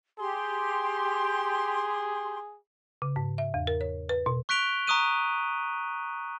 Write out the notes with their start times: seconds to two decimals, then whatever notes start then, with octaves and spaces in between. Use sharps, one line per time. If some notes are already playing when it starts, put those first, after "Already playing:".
0.19 G4 G#4 C6
3.02 C#3
3.16 G#2
3.38 E5
3.54 E2
3.67 A#4
3.81 C#5
4.09 B4
4.26 B2
4.49 C#6 F#6 B6 D7 F7 G7
4.87 A#5 C#6 D#6 F#6 D#7